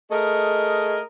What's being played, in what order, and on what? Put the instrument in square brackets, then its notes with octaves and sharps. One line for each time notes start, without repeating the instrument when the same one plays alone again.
[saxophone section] A3 G#4 A#4 D#5